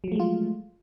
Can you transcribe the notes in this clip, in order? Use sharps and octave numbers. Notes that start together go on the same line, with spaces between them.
F3 F#3 G#3 A3 F4